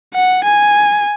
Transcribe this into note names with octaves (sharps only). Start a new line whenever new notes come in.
F#5
G#5